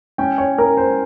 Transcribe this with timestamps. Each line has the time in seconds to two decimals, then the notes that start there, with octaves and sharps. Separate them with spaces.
0.18 C#4 G5
0.38 C#5
0.58 C#4 A#4
0.77 C5